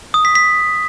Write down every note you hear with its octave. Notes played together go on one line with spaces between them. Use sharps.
D#6
B6
B6